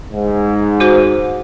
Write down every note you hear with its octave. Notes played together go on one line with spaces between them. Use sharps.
G#2
F#4 C5